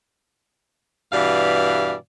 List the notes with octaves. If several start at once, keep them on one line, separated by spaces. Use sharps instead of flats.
G2 B2 E3 D5 F5